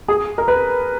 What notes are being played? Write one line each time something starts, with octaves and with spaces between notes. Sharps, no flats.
G#4
A#4
B4